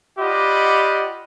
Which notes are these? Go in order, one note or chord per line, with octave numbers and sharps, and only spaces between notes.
F4 G4 D5 D#5 F#5 B5